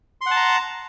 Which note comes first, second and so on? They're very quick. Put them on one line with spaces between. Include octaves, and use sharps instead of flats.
C6 F#5 A5 A#5